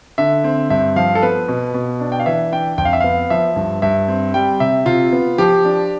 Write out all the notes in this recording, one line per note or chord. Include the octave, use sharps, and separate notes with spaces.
D3 E5
C4
G2 E5
F3 F5
A4
B3 B4
B2
B2
D4
G5
F5
E3 E5
D4 G5
F2 G5
F5
E5
B3 F5
F3 E5
G2
G2 E5
C4
G3 G5
C3 E5
C3 F4
B3
F3 G4
D4